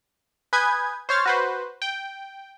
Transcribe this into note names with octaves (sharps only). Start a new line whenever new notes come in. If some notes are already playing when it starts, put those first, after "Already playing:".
B4 G#5 D#6 G6 G#6
C5 C#5 F6 A6
F#4 B4 C5
G5